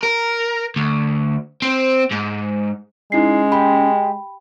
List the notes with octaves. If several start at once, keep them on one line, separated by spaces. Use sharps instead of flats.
A#4
D2
C4
G#2
G#3 C#4 D#4 E4 C7
G4 B5